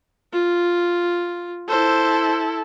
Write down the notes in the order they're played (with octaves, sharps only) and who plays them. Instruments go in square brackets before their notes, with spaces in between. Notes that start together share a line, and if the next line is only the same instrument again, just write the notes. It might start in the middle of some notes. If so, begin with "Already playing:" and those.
[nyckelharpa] F4
[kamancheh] E4 A4 [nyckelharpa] C5